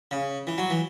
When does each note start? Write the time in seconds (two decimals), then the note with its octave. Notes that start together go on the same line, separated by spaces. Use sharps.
0.11 C#3
0.47 E3
0.58 F#3
0.70 E3